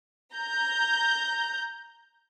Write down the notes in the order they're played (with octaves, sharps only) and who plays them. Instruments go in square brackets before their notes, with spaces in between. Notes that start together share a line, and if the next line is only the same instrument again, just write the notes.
[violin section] A#5 G6